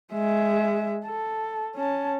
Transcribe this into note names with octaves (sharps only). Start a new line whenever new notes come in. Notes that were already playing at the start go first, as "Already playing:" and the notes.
G#3 E5
A4
C#4 A5